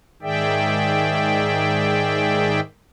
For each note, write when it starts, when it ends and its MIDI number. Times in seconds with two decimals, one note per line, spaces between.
0.22 2.60 44
0.22 2.60 51
0.22 2.60 68
0.22 2.60 74
0.22 2.60 76
0.22 2.60 79